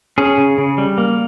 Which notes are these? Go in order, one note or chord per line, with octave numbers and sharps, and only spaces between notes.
C#4 G#4
C#3
C#3
G3
A#3